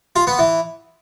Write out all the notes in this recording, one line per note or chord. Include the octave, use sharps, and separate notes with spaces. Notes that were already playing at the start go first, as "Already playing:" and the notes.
F4
B3
E3